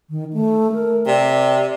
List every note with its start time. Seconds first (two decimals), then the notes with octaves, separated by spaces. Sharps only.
0.10 D#3
0.33 A3
0.73 A#4
1.06 C3 D5